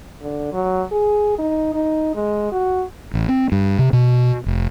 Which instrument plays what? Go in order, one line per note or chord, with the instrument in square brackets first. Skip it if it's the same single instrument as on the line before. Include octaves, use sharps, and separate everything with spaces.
[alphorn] D3
F#3
G#4
D#4
D#4
G#3
F#4
[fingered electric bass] A1
C4
G2
C3
B2
F1